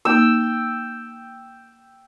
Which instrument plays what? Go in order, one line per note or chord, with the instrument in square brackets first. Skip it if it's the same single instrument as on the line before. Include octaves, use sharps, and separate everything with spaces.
[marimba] A#3 D#4 [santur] G5 E6